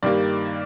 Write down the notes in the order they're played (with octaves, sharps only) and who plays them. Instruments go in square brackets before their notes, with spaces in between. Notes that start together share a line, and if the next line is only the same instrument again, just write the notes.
[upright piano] G2 D#3 G3 A#3 D5